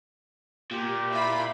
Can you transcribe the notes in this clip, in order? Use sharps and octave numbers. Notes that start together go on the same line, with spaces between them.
A#2 G4
E4 F4 B5